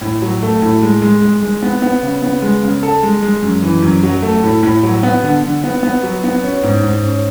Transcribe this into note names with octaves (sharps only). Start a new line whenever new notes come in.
A2
F#3
A3
A2
G#3
G#3
G#3
G#3
B3
B3
C#3
B3
G#3
C#3
A4
G#3
G#3
F#2
E3
F#2
F#3
A3
A2
A2
F#3
B3
D3
D3
B3
B3
F#3
B3
C#4
G#2
G#2
C#4